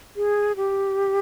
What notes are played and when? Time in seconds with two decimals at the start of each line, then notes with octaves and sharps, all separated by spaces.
0.16 G#4
0.56 G4